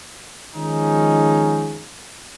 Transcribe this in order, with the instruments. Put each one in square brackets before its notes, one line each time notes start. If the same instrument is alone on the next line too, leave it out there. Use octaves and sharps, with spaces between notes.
[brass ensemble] D#3 F3 G#3 C#4 D#4